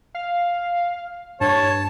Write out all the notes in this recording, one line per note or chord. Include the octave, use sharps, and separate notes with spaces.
F5
G2 C#5 A5